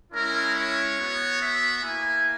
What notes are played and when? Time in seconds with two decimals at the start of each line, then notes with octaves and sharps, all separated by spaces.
0.13 G#3 C#4 E4 A#4
0.56 C#5
0.98 B3 F#4
1.41 E5
1.83 A#3 E4 G#5